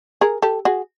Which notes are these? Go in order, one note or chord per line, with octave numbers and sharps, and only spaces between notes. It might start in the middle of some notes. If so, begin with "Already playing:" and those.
G#4 A#4
G4 A4
F#4 G#4